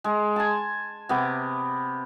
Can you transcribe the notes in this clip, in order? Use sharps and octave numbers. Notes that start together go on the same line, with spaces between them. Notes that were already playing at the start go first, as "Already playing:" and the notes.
G#3
G#5 A5
C3 B3 D6